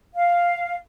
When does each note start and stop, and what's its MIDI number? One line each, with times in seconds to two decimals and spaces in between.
0.15 0.76 77